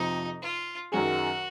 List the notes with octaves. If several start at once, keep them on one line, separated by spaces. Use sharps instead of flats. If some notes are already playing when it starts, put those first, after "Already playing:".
Already playing: F2 C3 F3 D#4
F4
F#2 D#3 F#3 C#4 F#4 G#4